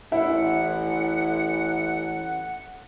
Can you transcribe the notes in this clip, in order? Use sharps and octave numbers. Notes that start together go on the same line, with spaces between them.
A1 E4 F#5